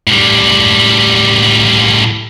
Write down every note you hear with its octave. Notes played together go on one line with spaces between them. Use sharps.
A2 G3